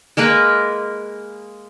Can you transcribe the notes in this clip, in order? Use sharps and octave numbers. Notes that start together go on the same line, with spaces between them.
G#3 A#3 A#4 B4